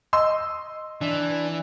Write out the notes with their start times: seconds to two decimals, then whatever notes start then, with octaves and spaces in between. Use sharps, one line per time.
0.13 D#5 C6 E6
1.01 E3 D4